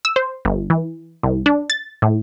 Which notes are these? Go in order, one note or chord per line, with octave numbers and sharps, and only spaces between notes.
E6
C5
G1
E3
C2
D4
A6
A2